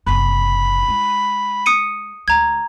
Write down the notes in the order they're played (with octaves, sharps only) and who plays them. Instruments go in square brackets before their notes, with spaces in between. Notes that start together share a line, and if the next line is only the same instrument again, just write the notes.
[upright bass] F#1 C3 [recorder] B5
[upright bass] G#3 E4
[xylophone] D#6 C#7 D#7
[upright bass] D2 [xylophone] A#5 G#6